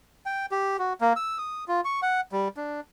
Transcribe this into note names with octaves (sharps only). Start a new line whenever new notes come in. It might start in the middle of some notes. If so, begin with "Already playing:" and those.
G5
G4
F#4
A#3
E6
D#6
F4
C#6
F#5
G3
D4